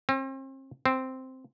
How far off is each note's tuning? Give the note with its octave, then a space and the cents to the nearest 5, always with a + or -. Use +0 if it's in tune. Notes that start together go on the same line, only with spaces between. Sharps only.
C4 +40
C4 -5